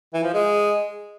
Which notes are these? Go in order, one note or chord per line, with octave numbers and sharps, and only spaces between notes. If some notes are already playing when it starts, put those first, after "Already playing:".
E3
F3
G#3